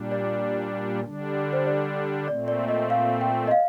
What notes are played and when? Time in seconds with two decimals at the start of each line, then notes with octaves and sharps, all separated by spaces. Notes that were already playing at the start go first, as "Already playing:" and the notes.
Already playing: A#2 G3 D4
0.12 D5
1.04 D3 G3 D4
1.53 C5
1.66 D5
2.28 A#2 A3 C4 D5
2.48 D5
2.68 D#5
2.90 F5
3.21 G5
3.47 D#5
3.51 F5